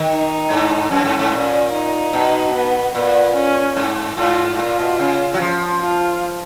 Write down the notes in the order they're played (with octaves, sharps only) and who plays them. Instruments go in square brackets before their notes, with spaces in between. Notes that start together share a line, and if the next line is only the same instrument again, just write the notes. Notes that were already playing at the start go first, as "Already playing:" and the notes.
Already playing: [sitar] D#3
[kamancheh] D#4
[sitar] G#2
[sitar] F#2 [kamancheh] C#4
[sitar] G#2
G#2
A#2
[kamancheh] D#4
[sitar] B2
[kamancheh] B3
[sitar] A#2 [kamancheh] B3
[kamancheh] C#4
[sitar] G#2
[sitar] G#2 [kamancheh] F4
[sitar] A#2 [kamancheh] F4
[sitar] B2
C#3
F#3
F3
[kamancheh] F4